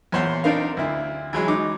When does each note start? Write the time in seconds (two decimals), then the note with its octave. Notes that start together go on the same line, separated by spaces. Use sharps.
0.12 E2 A#2 C5 C#5 F#5 C6
0.44 C4 D4 D#4 A#4 F5
0.77 D2 E4
1.33 E3 F#3 G#3
1.48 D#4 D6